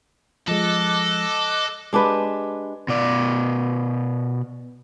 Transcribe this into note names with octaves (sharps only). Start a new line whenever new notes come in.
F3 G#3 A4 D#5 D6 F#6
G#3 D4 G4 B4
B2 D5